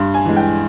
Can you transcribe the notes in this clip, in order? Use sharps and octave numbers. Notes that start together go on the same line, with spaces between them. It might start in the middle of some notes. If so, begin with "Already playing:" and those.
Already playing: G2 C6
G#5
E3 G#3
G5